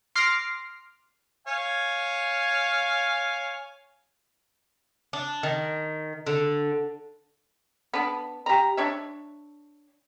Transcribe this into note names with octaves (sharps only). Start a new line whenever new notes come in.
C6 D6 F6 A#6 C7
C#5 F5 G#5
D4
D#3
D3
B3 D4
G4 A#5
D4 C#5 E5